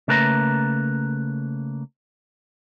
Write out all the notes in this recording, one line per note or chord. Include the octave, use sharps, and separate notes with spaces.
C#3 A3 A#3 B4 E5 A#5